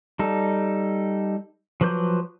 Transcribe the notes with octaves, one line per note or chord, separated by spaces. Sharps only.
G3 D#4 A4
F3 F#3 B4 D6 G6